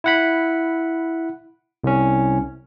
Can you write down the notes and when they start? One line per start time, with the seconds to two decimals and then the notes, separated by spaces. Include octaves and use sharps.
0.04 E4 F#5 B5
1.84 C2 C#4